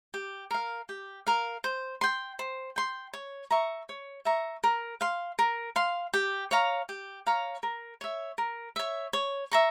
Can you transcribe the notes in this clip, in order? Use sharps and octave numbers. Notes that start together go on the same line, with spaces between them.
G4
A#4 F5
G4
A#4 F5
C5
G5 C6
C5
G5 C6
C#5
E5 A#5 C#6
C#5
E5 A#5 C#6
A#4
F5 C6
A#4
F5 C6
G4
C#5 F5 A#5
G4
C#5 F5 A#5
A#4
C#5 E5
A#4
C#5 E5
C#5
E5 A#5 C#6